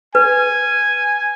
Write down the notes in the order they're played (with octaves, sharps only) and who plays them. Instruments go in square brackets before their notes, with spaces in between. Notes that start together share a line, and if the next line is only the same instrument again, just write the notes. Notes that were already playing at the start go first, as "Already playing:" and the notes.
[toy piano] B4 [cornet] G#5